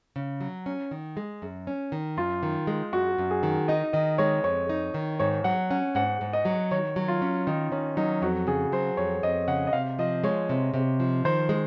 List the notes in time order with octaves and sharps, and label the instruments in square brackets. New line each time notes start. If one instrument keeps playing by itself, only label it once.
[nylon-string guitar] C#3
F#3
C#4
D#3
G#3
F#2
C#4
D#3
[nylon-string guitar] F#2 [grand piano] F4
[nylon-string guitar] D#3
G#3
[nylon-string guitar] F#2 [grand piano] F#4
[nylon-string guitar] F#2
[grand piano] G#4
[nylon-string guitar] D#3
[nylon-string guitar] D#4 [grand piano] D#5
[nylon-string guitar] D#3 [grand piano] D#5
[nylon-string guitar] G#3 [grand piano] C#5
[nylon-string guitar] F2 [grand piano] C#5
[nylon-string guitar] D#4
D#3
[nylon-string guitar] G#2 [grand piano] C#5
[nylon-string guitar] F#3 [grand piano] F#5
[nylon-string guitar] C#4 [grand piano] F#5
[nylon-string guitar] G#2 [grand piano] F#5
[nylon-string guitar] G#2
[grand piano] D#5
[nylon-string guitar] F#3
[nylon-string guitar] D#3 [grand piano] C#5
[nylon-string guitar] F#3
[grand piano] F4
[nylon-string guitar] C#4
[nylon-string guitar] D#3 [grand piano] D#4
[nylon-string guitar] D#3 [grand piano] C#4
[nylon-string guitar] F#3 [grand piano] D#4
[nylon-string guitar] F2 [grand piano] F#4
[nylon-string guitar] C#3 [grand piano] G#4
[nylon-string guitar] F#3 [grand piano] C5
[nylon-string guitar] F2 [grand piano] C#5
[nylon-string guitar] F2 [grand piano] D#5
[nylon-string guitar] C#3 [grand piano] F#5
[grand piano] D#5
[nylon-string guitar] C3 [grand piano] F5
[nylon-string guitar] F3 [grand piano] D#5
[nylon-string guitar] G#3 [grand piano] C#5
[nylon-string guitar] C3
C3
F3
[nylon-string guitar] D#3 [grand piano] C5
[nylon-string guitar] G#3